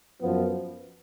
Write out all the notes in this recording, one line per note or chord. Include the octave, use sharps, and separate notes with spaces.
F#2 F3 B3